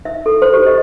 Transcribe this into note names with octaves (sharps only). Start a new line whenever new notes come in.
E5
A4
C5
G4
D#5